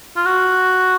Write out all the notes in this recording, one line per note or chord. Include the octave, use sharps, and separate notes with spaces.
F4
F#4